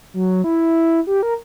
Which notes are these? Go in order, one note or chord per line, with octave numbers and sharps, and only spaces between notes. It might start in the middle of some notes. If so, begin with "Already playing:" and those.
F#3
E4
G4
A#4